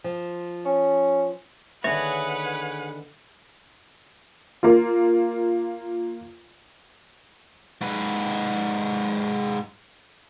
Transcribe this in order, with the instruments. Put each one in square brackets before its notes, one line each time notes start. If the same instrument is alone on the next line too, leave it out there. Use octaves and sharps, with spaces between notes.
[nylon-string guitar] F3
[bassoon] C#4
[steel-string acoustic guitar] D3 D#3 A#3 [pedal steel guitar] G#4 C#5 [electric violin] B4 F#5 [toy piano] E5
[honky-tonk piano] A#3 F4
[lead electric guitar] G#2 B4